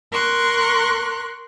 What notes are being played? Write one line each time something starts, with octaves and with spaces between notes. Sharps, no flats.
A#4 C6 C#6 F#6